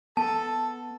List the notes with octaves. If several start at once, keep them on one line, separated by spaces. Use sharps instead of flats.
B3 A4 A5